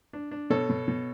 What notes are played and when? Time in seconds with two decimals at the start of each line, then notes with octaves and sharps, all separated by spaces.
0.13 D4
0.31 D4
0.50 B2 A4 C#5
0.69 B2
0.88 B2